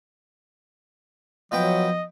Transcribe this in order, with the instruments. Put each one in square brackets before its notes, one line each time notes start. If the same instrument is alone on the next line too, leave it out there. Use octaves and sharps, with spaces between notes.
[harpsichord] F3 B3 G5 [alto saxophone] F#3 [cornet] D#5